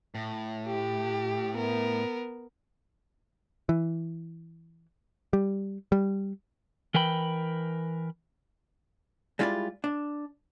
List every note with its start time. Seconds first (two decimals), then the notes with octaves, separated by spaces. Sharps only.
0.15 A2
0.67 G4
1.54 B3 A#4
3.69 E3
5.33 G3
5.92 G3
6.94 E3 A#4 B4 G5 B5
9.39 G3 G#3 E4 F4 C5 D5
9.84 D4